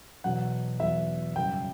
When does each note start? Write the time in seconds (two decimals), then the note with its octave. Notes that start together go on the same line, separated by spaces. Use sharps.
0.24 E2 B2 F#3 F#5
0.80 E2 B2 F#3 E5
1.36 F#2 C#3 G3 G5